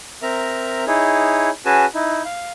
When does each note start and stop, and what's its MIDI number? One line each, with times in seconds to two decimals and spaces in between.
0.22 0.85 60
0.22 0.85 70
0.22 0.85 76
0.22 0.85 82
0.87 1.50 63
0.87 1.50 64
0.87 1.50 68
0.87 1.50 73
1.65 1.86 61
1.65 1.86 66
1.65 1.86 68
1.65 1.86 71
1.65 1.86 80
1.65 1.86 81
1.94 2.23 63
1.94 2.23 64
2.25 2.52 77